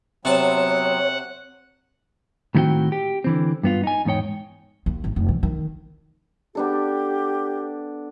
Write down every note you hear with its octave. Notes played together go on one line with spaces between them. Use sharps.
C3 F#3 B3 C4 C#5 F#5 A5
A2 D#3 G3 C4 F#4 G5
G4
D3 E3 C4
G2 B3 F4
D#4 G#5
E2 G#2 D#4 C#5 G5
D#2
G#1
F1
E3
D#3
B3 D4 G4 A4